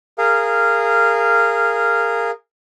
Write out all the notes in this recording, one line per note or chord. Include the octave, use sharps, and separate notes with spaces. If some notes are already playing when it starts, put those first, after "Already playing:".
G#4 A#4 F5